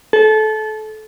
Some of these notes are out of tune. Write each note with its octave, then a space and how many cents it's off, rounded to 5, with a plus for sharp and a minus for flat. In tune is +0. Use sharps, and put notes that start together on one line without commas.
A4 -25